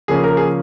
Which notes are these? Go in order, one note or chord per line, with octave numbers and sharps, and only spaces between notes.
C#3 F3 A#3 C#4 G#4
A#4
G#4